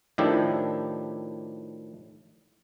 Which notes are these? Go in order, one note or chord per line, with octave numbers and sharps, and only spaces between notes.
A2 D#3 F3 D4 E4 G4